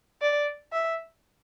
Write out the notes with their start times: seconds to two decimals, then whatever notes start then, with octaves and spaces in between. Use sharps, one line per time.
0.21 D5
0.72 E5